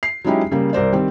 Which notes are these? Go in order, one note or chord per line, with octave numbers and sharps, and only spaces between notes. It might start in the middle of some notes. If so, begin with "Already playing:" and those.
C7
F#3 G#3 C#4 D#4 E4 G4
C#3 G3 A#3
C2 A#4 C5 D5
D#3 G3 C4